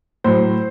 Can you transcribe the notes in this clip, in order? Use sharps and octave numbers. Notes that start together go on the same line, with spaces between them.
A2 F#3 C5